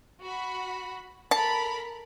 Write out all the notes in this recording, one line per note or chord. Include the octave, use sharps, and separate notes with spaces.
F#4 B5
A4 A#4 A5 B5